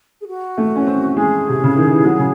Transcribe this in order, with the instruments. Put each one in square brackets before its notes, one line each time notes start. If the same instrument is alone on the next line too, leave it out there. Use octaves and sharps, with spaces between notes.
[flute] G#4
F#4
[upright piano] A3
C#4
C4
[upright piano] G#3 [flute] G#4
[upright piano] C3
C#3
D#3
E3
F#3
C#3